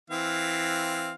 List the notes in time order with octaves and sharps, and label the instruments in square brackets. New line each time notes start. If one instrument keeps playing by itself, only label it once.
[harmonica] E3 C4 F5